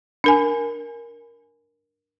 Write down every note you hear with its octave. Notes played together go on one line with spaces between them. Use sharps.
D4 A#4 G#5